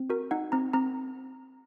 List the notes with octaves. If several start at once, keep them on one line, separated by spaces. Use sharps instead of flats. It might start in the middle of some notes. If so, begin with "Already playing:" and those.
Already playing: C4
F#4 A#4
D#4 F#5
C4 A#5
C4 A#5